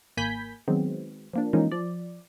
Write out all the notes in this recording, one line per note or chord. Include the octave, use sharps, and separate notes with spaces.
G#1 A#3 G#5 B5 G6 B6
D#3 F#3 G#3 B3 C4
F3 A#3 D4
E3 F3 G#3 A#3 C#4 D#4
F3 D5